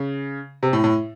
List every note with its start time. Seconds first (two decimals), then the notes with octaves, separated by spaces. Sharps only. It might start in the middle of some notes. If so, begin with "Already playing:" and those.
Already playing: C#3
0.63 C3
0.73 A2
0.84 A2